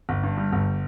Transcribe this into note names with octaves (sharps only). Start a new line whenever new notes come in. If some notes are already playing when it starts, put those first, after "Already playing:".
G1
G2
G3
G1